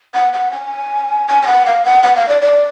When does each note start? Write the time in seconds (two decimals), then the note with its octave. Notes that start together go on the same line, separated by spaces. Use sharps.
0.14 F#5
0.33 F#5
0.52 G#5
1.28 G#5
1.42 G#5
1.47 F#5
1.66 F5
1.85 F#5
2.03 F#5
2.16 F5
2.28 D5
2.42 D5